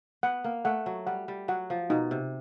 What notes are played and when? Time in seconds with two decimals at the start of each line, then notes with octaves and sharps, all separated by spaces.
0.23 B3 F#5
0.44 A#3
0.65 A3 F#5
0.86 F#3
1.07 G3 F#5
1.28 G3
1.48 F#3 F#5
1.70 F3
1.90 B2 D#4
2.11 C3